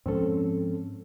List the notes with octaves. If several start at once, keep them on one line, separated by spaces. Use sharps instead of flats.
G#2 F3 G#3 C4 C#4 A4